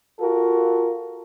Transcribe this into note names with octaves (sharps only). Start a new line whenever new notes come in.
F4 F#4 A4 A#4